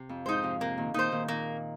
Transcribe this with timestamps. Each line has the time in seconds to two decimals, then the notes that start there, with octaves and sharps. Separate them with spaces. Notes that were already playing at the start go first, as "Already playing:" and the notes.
Already playing: C3
0.09 F2
0.26 G#2 D#4 C5
0.43 C3 F3
0.60 C3 A#3
0.78 A#2 D#3
0.94 A#2 D#3 D#4 C5
1.12 A#2 D#3
1.28 A#2 D#3 A#3